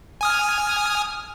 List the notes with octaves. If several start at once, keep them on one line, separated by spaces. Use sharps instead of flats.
G#5 D#6 F6